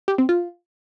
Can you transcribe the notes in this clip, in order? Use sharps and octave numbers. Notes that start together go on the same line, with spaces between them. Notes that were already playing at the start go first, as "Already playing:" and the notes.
G4
C4
F4